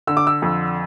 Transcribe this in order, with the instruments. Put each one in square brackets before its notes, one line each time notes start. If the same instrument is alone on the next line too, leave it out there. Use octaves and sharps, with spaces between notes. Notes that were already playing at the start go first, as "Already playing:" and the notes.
[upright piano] D3 E6
D6
E6
F2